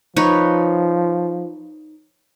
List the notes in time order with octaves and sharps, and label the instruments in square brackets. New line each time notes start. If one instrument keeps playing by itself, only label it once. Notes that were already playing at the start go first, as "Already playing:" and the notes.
[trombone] F3 [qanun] D#4 B4 C#5